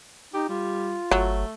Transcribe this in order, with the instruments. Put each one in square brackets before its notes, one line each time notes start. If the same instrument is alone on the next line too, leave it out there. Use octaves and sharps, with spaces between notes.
[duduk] D#4 [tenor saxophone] G4
[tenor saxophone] G3 [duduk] F4
[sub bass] G1 [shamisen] F#3 [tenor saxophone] A3